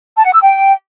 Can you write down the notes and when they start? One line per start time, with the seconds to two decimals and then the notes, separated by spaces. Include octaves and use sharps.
0.16 A5
0.25 F#5
0.34 E6
0.42 G5